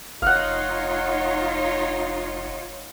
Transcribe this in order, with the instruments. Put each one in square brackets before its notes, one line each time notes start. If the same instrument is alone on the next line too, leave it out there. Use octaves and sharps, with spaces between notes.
[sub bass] F1 [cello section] D#4 F4 C#5 [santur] F5 F#5